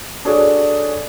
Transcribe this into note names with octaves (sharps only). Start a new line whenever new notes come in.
D4 F#4 G#4 A4 C#5 D5